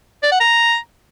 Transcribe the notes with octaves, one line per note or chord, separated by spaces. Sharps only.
D5
F#5
A#5